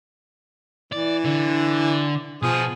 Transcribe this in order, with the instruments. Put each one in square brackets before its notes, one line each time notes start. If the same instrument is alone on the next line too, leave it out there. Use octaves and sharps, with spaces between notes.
[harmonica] E3 [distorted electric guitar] D5
[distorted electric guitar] D3
[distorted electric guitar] B2 [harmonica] F3 G#4